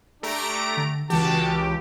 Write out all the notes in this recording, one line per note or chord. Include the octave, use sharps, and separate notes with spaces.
A3 D4 G4 A#5 D7
D3
C#2 E3 G#3 F#4 G4 A5